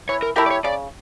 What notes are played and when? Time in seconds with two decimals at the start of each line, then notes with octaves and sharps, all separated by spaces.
0.09 E3 C#5
0.22 A#4
0.36 A3 E4 G4 A#4
0.46 D5
0.51 C#5
0.64 C#3 D5